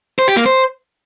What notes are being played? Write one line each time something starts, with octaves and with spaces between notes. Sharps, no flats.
C5
G4
A#3
C5